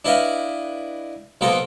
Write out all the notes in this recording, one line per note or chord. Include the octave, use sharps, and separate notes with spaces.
D4 E4 B4 D#5 F5
B1 A#3 B3 A4 A#4 C5